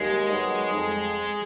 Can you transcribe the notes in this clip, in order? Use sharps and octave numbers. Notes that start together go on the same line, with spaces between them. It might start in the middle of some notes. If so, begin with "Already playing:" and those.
Already playing: D#2 G#3
D#3 F#3 B3 D#4
F2